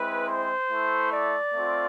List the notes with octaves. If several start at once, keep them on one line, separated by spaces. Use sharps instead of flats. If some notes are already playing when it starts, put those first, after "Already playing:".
Already playing: G#3 C4 E4 B4
C5
A3 E4
D5
A3 C4 F4